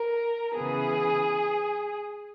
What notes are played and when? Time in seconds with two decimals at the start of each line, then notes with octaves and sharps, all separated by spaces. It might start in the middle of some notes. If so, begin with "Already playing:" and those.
Already playing: A#4
0.55 C#3 E3 B3 G#4